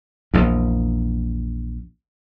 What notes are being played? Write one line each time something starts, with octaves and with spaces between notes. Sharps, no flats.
A#1 E2